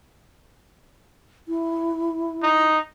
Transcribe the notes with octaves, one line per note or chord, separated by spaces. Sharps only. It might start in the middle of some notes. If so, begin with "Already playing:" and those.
E4
D#4